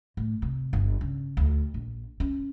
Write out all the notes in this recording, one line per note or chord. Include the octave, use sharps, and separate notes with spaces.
A2
C3
G1
C#3
D2
A#1
C#4